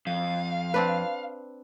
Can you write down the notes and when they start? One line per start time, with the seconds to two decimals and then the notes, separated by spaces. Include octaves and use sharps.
0.07 F2 F5
0.74 C4 D4 B4